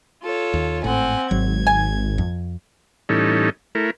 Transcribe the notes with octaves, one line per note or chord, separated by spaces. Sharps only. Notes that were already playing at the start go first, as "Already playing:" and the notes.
F4 A4 C#5
D#2
G#1 A2 C4 F#5 G#5
G#1 F#3 G#6
G#5
F2
A2 E3 G3 C#4 D#4 A4
A3 E4 A#4